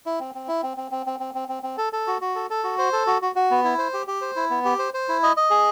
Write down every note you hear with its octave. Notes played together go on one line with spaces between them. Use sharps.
E4
C4
C4
E4
C4
C4
C4
C4
C4
C4
C4
C4
A4
A4
F#4
F#4
A4
A4
F#4
C5
A4
F#4
F#4
F#4
B3
E4
C5
G4
G4
C5
E4
B3
G4
C5
C5
E4
D#5
D#5
G#4